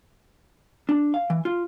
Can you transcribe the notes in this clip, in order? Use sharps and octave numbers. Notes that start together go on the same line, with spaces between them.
D4
F5
E3
F4